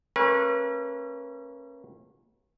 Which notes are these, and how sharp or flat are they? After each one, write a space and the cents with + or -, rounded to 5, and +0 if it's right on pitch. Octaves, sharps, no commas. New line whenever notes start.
A3 +45 C#4 -30 B4 -45